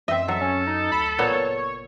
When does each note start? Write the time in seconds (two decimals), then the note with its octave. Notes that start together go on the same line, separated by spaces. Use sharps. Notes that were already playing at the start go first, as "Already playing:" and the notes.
0.08 F#2 C4 D#5 E5
0.28 F#3 A4
0.41 C#4
0.67 D#4
0.92 D2 B5
1.19 F#1 A#2 A#3 B3 C#5